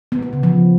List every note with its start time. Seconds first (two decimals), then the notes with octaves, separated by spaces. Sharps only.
0.12 B3
0.22 B3
0.33 C#3
0.43 F3